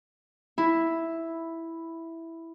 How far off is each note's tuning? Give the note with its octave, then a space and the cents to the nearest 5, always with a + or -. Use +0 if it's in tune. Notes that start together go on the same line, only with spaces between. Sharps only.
E4 +0